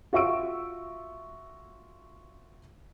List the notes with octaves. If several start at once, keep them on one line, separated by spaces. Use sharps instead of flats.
F4 F#4 E5 C#6 E6 D7